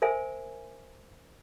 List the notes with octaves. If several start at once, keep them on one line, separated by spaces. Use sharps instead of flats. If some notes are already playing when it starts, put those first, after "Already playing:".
A#4 C5 E5 G#5